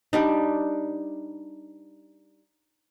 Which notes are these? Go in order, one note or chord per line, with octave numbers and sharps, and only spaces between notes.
G3 D4 D#4